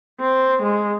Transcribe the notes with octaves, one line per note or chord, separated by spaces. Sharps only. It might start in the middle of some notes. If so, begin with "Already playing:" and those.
C4
G#3